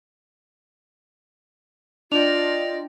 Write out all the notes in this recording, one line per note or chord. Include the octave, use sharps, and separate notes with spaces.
D4 F4 D5 D#5 G5 F7